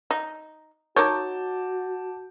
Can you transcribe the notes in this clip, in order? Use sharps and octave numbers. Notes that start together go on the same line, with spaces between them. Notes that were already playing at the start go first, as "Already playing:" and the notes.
D#4
D#4 F#4 A#4 C#5 A5 D6 G6